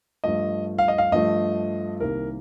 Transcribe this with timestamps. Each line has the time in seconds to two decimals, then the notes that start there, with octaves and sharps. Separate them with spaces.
0.24 G2 F3 A3 D#5
0.78 F5
0.88 D#5
0.98 F5
1.12 G2 F3 A3 D#5
2.00 C2 C3 D#3 A#3 A#4